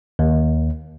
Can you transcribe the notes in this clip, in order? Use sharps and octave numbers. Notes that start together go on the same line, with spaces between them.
D#2